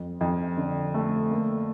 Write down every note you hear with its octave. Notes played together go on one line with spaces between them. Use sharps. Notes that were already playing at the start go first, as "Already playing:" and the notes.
Already playing: F2
F2
D3
A3
A#3